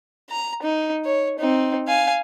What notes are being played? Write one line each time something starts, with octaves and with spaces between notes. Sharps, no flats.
A#5
D#4
C#5
C4 D#4
F5 G#5